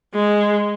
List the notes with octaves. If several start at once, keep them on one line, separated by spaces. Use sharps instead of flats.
G#3